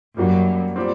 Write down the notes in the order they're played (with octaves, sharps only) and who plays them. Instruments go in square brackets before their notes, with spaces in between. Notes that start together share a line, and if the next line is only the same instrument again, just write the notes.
[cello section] F#2 [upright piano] G3 A#3 F#4
[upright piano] A#2 G3 C4